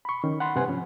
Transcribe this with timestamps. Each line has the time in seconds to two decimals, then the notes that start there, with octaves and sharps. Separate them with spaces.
0.05 B5 C#6
0.24 D#3 C#4
0.40 F#5 B5 C6
0.55 G2 C3 B4 F#5 G#5
0.68 F3 C#4